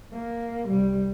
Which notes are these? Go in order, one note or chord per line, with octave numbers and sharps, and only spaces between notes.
A#3
C2 G3